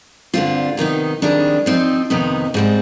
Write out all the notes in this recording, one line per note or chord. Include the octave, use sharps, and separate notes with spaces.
G2 D3 G3 C4 F4
C3 D#3 B3 D#4
F2 D#3 G3 D4 G#4
F3 C4 D#4
F2 C3 D#3 B3 D#4
G#2 G3 C4